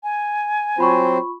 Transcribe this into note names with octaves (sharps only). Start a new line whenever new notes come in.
G#5
F#3 C4 F4 C5 B5 C#6